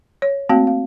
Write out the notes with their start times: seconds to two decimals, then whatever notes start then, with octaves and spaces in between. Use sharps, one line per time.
0.22 C#5
0.49 A3 A#3 C4 F#4 F5 G5
0.67 F5